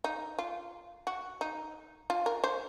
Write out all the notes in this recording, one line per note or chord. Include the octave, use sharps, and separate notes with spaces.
D#4
F4
F#4
D#4
F4
A#4
C5